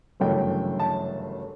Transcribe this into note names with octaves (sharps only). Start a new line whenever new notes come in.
G1 F#2 C#3 E3 A3 G5
A5